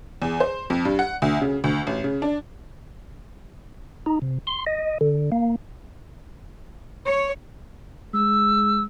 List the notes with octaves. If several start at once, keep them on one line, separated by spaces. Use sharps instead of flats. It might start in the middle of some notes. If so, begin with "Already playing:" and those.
E2
C5
F2
G2
F#5
D2
C#3
D2
A1
C#3
D4
D#4
C3
C6
D#5
D3
A#3
C#5
G#3 E6